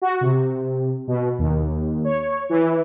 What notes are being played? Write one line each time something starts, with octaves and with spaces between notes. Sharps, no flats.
F#4
C3
B2
D#2
C#5
E3